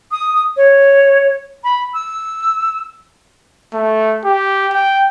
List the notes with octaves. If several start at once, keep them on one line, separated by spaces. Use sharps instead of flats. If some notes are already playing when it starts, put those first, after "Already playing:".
D#6
C#5
B5
E6
A3
G4
G5